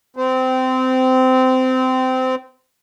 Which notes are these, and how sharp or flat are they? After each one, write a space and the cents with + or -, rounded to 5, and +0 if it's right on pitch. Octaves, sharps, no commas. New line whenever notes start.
C4 -20